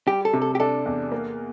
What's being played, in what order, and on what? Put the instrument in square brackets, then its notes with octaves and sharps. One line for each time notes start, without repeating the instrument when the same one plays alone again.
[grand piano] G3 [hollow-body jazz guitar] G4
[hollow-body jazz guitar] A4
[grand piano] C3
[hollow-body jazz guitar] A4
G4
[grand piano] D4 [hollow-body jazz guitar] A4
[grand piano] E2
A#3